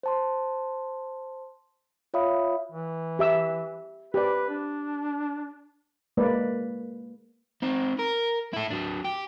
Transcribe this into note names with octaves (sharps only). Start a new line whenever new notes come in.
C5 A5 C6
F4 C#5 E5 F5 B5 D#6
E3
G4 E5 E6
G4 B4 D5
D4
G#3 A#3 B4 D5
C4 D#4
A#4
E4 A4
F#3 D4
G4